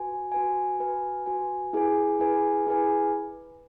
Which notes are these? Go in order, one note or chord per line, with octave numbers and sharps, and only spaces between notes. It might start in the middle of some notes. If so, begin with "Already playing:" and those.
Already playing: F#4 B4 G#5
F#4 B4 G#5
F#4 B4 G#5
F#4 B4 G#5
E4 G#4 B4 G#5
E4 G#4 B4 G#5
E4 G#4 B4 G#5